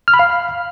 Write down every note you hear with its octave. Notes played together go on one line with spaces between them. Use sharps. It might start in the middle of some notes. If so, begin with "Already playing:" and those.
F6
B5
F5